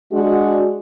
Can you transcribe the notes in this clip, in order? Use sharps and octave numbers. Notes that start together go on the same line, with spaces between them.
G#3 D4 F#4